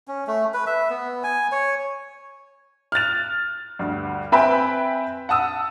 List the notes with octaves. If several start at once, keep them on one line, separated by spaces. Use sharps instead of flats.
C#4
A3
B4
E5
B3
G#5
C#5
F6 F#6 A6 F7
D2 G2
C4 B4 E5 G5 G#5 B5
F#5 A5 D#6 E6